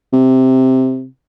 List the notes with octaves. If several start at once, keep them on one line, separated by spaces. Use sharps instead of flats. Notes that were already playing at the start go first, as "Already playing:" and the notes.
C3